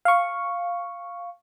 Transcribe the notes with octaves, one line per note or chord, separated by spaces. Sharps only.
F5 C#6